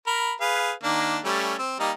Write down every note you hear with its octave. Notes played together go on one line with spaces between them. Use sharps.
A#4 B5
G#4 B4 F5
D#3 A#3 D4
G3 A3 C#4
C4
G3 A#3 D#4